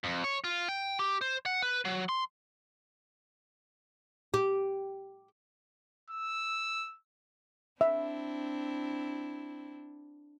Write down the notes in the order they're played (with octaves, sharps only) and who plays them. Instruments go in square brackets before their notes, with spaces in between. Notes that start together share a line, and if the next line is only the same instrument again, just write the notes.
[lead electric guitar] F2
C#5
F4
G5
G4
C5
F#5
B4
F#3
C6
[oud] G4
[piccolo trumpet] E6
[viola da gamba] C4 D4 E4 [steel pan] E5